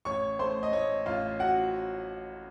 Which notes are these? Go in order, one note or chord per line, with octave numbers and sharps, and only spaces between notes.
A1 C#5 C#6
A3 C5 C6
D#5
A2 C#5
A1 F4 F5
F#4 F#5